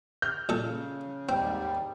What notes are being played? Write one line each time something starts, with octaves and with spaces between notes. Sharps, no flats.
F6 G6
A#2 C#3 A4
D#2 G#2 G3 C4 G5